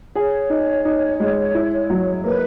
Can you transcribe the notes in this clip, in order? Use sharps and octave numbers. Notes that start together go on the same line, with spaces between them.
G#4 C#5
D#4
D#4
G#3
E4
F#3
A#3 B4